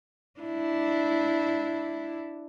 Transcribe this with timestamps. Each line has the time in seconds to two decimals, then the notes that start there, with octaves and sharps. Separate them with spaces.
0.40 D4 E4